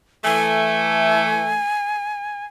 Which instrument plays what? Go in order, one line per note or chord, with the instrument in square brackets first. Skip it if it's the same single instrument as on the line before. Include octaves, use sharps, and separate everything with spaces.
[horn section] E3 A3 [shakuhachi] G#5